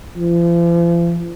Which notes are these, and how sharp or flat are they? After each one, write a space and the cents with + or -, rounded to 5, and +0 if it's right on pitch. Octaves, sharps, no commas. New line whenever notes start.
F3 -40